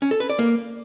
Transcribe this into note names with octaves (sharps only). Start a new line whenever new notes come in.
C#4
A4
B4
D5
A#3